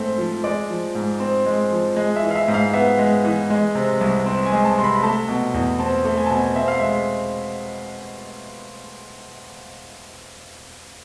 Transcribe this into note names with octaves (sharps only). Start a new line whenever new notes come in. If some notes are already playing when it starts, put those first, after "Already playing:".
Already playing: G#2 A3 C4
F3
G#3 D5
F3
G#2
C4
G#3
F3
G#3
E5
E3
F5
E5
G#2
F5
B3 E5
G#3
E3
G#3
C3
C2
C4
G#5
G#3
A5
C3 C6
B5
A3 A5
B2
E2
C4 A5
A3
G#5
A5
B2 G#5
C4 E5
F5
G#3 E5